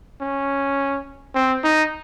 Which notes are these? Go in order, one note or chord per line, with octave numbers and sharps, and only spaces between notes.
C#4
C4
D#4